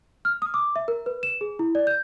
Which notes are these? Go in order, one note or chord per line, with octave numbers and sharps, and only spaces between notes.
F6
D#6
D6
E5
A#4
B4
E7
G#4
E4
D5
G6